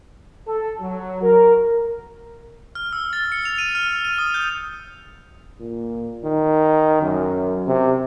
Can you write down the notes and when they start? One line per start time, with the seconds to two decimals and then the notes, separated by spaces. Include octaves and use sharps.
0.48 A4
0.80 F#3
1.22 A#4
2.75 F6
2.93 E6
3.13 A6
3.32 C#7
3.45 F7
3.58 D#7
3.75 F6
4.05 D#7
4.18 D#6
4.34 G6
5.60 A#2
6.24 D#3
7.02 F#2
7.67 C3